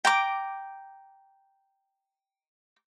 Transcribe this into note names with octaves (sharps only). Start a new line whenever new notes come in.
G5 A#5 D6